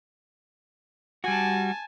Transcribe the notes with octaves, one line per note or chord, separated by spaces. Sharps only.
G3 F#4 G#5 A5